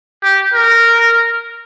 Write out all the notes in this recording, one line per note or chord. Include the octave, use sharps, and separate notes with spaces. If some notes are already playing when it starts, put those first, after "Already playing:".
G4
A#4